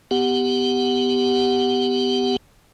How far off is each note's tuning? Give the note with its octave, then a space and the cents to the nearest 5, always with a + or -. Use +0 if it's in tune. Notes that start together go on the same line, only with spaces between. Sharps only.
B3 +15 G4 +0 F#5 +0